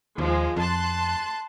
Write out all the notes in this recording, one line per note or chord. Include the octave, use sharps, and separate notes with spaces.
D#2 F3 G#3
F2 A5 C6 F#6